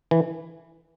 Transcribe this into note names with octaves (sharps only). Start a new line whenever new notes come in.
E3